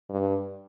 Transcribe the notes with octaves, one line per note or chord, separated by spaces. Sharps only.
G2